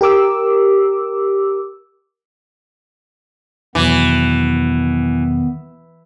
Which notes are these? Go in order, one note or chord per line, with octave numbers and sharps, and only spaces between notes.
G4 A#4 D6 E6
E2 B2 D#3 E3 F#3 B3